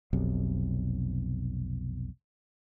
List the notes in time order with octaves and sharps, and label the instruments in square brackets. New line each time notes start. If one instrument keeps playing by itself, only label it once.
[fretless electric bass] F1 B1 C3